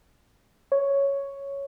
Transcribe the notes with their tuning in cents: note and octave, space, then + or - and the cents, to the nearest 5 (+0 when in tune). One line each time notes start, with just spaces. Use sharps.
C#5 +0